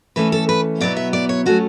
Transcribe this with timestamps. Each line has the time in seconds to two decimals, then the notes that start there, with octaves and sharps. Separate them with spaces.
0.16 E3 A3 C#4 B4
0.32 A4
0.49 B4
0.80 B2 F#3 B3 E4 D5
0.97 E5
1.13 D5
1.29 C#5
1.46 F#3 A3 C#4 F#4